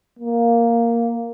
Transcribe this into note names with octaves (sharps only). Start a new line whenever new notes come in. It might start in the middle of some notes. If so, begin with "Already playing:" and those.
A#3